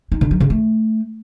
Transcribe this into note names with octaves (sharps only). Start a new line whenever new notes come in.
D#4
D3
F#3
C#3
A3